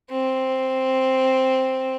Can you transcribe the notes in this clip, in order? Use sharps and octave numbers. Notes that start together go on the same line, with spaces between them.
C4